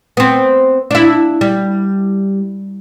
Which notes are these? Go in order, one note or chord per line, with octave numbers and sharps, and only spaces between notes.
B3 C4
D4 E4
G3